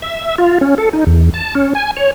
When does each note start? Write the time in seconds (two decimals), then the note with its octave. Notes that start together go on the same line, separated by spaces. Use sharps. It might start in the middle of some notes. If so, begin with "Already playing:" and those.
0.02 E5
0.38 F4
0.61 C#4
0.78 A4
0.93 D#4
1.07 E2
1.34 A5
1.55 C#4
1.75 G#5
1.97 C#5